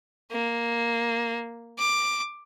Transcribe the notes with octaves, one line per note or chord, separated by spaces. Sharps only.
A#3
D6